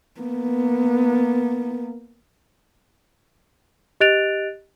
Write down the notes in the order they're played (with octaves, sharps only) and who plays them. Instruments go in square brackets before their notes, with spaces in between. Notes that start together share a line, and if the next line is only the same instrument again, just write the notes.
[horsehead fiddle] A#3 B3
[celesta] G4 D#5 F#6 A6 D7 F7